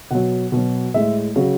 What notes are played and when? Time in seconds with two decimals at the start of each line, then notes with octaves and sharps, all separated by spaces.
0.11 B2 F#3 F#5
0.52 B2
0.57 F#3
0.94 A2 G#3 E5
1.36 C#3 F#3 F#4